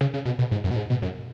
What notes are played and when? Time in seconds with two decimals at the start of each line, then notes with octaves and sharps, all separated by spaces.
0.01 C#3
0.14 C#3
0.25 B2
0.39 B2
0.51 G#2
0.64 F#2
0.71 B2
0.76 G#2
0.90 B2
1.02 F#2